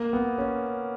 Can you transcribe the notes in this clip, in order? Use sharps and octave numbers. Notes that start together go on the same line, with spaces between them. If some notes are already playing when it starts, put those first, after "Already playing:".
Already playing: A#3
B3
C#4